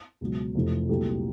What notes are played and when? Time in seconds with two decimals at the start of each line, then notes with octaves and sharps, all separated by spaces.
0.21 C#2 B2 F#3
0.55 F1 F2 C3 E3
0.89 C2 A#2 F#3 G4 A4